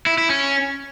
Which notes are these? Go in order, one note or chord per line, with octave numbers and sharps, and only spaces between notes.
E4
E4
C#4